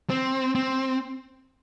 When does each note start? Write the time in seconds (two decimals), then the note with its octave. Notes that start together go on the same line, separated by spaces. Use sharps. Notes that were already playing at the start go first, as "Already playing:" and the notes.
0.10 C4
0.55 C4